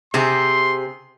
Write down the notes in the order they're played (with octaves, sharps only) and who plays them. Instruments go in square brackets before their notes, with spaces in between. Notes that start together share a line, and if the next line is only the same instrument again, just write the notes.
[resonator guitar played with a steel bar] C3 C4 G#4 [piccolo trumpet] C6